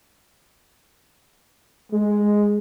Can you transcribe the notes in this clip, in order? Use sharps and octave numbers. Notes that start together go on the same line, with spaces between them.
G#3